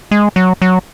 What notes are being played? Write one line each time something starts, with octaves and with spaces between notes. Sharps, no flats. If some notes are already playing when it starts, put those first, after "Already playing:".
G#3
F#3
F#3